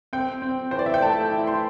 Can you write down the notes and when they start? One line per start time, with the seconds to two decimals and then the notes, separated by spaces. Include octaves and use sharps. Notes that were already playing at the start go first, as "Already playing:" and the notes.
0.13 C4 G5
0.42 C4
0.71 E3 C5
0.79 D5
0.86 E5
0.94 G5
1.02 A3 A5
1.31 E4
1.47 C6